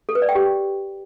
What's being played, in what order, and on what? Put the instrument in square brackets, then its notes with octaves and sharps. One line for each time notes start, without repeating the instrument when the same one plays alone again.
[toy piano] A4
B4
D5
G5
G4